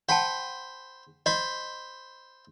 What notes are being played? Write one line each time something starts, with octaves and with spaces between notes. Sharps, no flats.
C5 F#5 G5 A5 B5
C5 D#5 B5